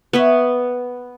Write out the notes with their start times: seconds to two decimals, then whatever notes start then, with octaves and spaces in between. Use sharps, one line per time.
0.13 B3 B4 C#5 E5